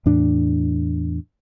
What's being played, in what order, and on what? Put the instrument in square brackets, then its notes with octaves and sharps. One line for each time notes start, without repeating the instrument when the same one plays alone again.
[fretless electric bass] E2 A2 D4